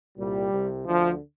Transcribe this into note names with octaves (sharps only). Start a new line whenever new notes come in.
C2 A#2 G3
C2 C3
D2 D3 F3